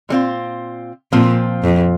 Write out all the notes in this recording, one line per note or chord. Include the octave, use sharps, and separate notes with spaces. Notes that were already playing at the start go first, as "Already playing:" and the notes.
A#2 G3 C4 F4
A#2 F3 C4 F4
F2